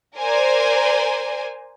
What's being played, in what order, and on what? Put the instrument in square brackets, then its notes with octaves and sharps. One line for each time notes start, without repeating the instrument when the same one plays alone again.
[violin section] A#4 C5 D5 G#5